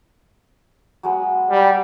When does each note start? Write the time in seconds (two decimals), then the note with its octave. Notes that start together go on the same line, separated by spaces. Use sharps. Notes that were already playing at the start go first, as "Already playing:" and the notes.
1.03 F#3 G#3 B3
1.50 G3